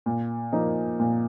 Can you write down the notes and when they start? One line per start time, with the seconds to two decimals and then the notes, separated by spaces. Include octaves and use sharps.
0.06 A#2
0.53 F3 A#3 D#4
1.00 A#2